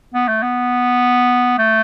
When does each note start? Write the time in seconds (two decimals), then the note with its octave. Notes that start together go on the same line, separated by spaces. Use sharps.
0.14 B3
0.28 A3
0.42 B3
1.58 A3